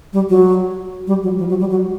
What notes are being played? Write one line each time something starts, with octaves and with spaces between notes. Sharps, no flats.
G3
F#3
G3
F#3
F3
F#3
G3
F#3